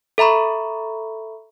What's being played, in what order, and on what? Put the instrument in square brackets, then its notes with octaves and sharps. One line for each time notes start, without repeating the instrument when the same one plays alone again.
[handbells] A4 E5 A#5 B5 C#6